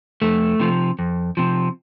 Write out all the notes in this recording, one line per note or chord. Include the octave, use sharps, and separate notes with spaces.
F2 A3
C3 F3
F2
C3 F3